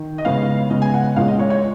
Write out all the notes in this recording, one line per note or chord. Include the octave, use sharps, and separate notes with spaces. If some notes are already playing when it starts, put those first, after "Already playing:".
Already playing: D#3
D#5
C#3 G#3 B3 F5
C#3 G#3 B3 D#5
G#5
F#5
F#5
A#2 G#3 C#4 F5
D#5
C#5
C#5